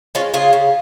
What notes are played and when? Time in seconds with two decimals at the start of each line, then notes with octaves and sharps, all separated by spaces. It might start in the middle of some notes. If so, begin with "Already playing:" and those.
0.15 G#3 C#4 F4
0.34 C#3 F4 G#4
0.53 C#3